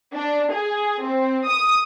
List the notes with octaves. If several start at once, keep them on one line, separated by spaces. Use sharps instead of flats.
D4
G#4
C4
D#6